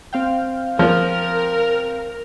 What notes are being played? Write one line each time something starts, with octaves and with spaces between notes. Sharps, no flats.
C4 F5 G5
F3 A#4